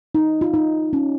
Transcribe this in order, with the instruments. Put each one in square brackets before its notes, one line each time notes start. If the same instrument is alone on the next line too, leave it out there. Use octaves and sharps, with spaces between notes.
[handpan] D#4
F4
D#4
C#4